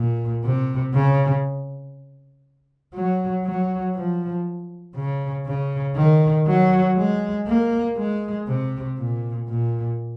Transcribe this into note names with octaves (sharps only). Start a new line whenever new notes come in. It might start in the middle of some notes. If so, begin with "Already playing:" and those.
Already playing: A#2
C3
C#3
F#3
F#3
F3
C#3
C#3
D#3
F#3
G#3
A#3
G#3
C3
A#2
A#2